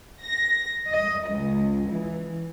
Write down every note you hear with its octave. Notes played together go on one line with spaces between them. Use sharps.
A#6
D#5
C#2
E3